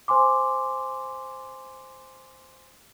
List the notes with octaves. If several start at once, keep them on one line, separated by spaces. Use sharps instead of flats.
C5 G#5 C6 D6